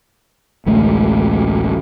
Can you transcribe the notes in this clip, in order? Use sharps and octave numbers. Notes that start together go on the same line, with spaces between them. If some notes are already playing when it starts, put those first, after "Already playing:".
A1 D2 G#3 A3